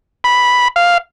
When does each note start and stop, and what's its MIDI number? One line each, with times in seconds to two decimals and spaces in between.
0.24 0.68 83
0.76 0.98 77